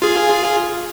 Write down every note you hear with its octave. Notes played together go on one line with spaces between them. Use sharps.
F4 G#4